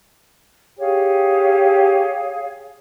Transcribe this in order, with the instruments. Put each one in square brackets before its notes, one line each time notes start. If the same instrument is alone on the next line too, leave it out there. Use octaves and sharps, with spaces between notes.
[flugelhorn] G4 [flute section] G#4 C#5 F5